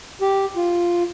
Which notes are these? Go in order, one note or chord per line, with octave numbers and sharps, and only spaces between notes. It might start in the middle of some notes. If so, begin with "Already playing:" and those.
G4
F4